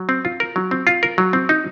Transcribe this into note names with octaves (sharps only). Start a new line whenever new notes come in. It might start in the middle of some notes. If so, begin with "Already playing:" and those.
Already playing: F#3
C4
F4
A#4
F#3
C4
F4
A#4
F#3
C4
D#4